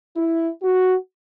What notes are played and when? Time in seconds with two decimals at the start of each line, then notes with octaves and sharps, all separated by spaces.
0.16 E4
0.62 F#4